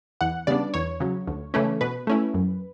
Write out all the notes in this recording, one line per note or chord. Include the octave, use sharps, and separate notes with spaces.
E2 F#5
C#3 G3 B3 D4 D5
E2 C#5
C#3 F#3
D2
C#3 E3 A3 C#4
B2 B4
A3 C#4 E4
F#2